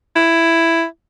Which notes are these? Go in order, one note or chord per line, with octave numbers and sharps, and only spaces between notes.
E4